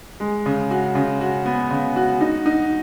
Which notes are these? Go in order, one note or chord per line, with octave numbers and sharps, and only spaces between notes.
G#3
C#3
F#4
C#3
F#4
B3
C#3
F#4
D#4
D#4